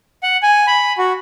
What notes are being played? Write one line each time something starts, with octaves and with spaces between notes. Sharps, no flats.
F#5
G#5
B5
F#4